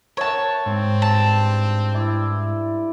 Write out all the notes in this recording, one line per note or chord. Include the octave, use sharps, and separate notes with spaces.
A#4 C#5 E5 F#5 A5
G#2 C4
G2 F4 A5
E4 D5 E5